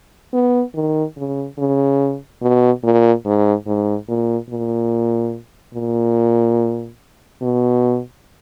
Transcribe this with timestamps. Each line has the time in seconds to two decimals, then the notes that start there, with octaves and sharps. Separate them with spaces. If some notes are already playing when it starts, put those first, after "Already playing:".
0.33 B3
0.75 D#3
1.17 C#3
1.58 C#3
2.42 B2
2.83 A#2
3.25 G#2
3.67 G#2
4.08 A#2
4.50 A#2
5.74 A#2
7.42 B2